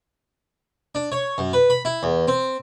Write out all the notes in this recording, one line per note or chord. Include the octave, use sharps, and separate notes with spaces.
D4
C#5
F#2
B4
B5
E4
E2
C4